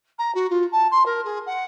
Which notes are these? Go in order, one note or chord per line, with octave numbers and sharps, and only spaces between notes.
A#5
F#4
F4
A5
C6
A#4
G#4
F#5